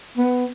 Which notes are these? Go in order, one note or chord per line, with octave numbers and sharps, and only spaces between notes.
B3